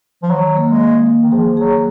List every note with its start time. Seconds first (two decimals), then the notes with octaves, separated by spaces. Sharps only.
0.23 F3
0.31 D#3 F#3
0.57 A#3
0.69 G#3
0.82 A#3
1.06 A#3
1.22 D#3
1.32 F3 G#4
1.57 F#3 G#4